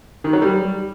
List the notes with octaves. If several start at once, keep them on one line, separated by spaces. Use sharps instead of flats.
D#3
F#3
G3